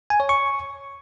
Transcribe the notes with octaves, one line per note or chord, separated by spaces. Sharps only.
G#5
C#5
C#6